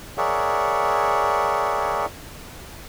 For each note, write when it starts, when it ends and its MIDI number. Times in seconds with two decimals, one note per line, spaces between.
0.18 2.06 68
0.18 2.06 70
0.18 2.06 73
0.18 2.06 74
0.18 2.06 76
0.18 2.06 78